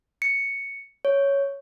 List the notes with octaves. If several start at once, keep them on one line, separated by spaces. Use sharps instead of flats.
C#7
C#5